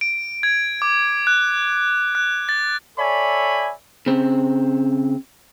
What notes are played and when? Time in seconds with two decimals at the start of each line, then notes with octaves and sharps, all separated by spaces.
0.01 D7
0.43 G#6
0.82 D6
1.27 F#6
2.15 F#6
2.49 A6
2.98 A4 C#5 D5 E5 G#5 B5
4.06 C#3 C4